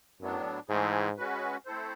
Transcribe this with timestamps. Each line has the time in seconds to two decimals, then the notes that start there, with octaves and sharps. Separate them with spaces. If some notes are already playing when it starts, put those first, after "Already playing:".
0.20 F#2 A2 F#3 B3 D4
0.69 G#2 E3 A3 C4 E4 G#4
1.17 G#3 C#4 F#4 B4
1.66 A3 C4 E4 A4 C5